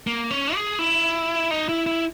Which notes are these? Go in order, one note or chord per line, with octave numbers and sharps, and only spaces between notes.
A#3
C#4
G#4
E4
D#4
E4
E4